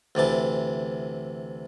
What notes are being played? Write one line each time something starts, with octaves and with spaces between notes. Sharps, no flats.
D2 C3 E3 A5